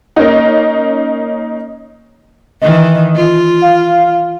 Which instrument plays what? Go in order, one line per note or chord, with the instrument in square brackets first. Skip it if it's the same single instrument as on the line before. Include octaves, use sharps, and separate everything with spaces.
[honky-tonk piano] A#3 C#4 D#4
[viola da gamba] D#3 E3 [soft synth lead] D#5
[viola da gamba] F4
[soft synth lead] F5